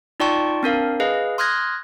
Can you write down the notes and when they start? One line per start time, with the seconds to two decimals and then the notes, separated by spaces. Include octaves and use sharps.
0.20 D#4 F4 D5 G5 A5 C#6
0.63 C4 D4 A#4 F5
1.00 G#4 B4 D#5 F5
1.38 C6 D#6 F6 F#6 G#6 A#6